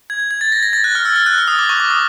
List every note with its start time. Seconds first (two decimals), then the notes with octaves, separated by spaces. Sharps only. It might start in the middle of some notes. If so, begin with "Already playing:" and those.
0.10 G#6
0.20 G#6
0.31 G#6
0.41 A6
0.52 A#6
0.63 A#6
0.73 A6
0.84 F#6
0.95 F6
1.05 E6
1.16 F6
1.26 F#6
1.38 F6
1.48 D#6
1.59 D6
1.69 C#6
1.80 D6
1.90 D#6